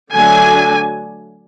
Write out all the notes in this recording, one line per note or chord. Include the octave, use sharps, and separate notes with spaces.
D3 F#3 A3 D4 G#5